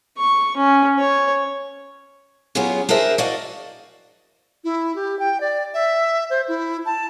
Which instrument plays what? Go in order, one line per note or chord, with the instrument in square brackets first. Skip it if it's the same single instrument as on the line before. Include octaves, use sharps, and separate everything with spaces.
[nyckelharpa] C#6
C#4
C#5
[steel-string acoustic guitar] F#3 B3 C#4 F4 G4 G#4
D4 G#4 A#4 C5 E5
F#4 D5 D#5 F5
[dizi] E4
G4
G5
D5
E5
C5
E4
A5